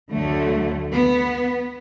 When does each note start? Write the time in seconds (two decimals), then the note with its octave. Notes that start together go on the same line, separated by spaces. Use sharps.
0.12 D2 D3 F#3 A3
0.91 B3